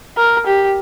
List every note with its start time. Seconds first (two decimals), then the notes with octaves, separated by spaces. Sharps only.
0.17 A#4
0.46 G4